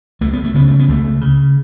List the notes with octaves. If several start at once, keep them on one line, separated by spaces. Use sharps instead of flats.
C#2 A3
B3
A3
C#3 B3
A3
B3
C#2 A3
C#3